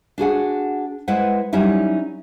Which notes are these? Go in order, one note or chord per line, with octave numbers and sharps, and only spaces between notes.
D4 F#4 G#4 F#5
G#3 E4 B4 C5 F#5
F#3 G3 C#4 D#4 E4